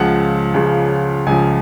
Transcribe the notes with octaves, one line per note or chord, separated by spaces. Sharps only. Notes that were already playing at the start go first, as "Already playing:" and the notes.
Already playing: C#2 C#3 F3 F#5
C#2 C#3 F3
C#2 C#3 F3 G#5